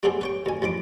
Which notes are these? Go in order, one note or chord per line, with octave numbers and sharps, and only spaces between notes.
G3 A3 B3 C4 G4 G#4
B4 C#5 G5
D2 G#5
A1 F3 B5 D6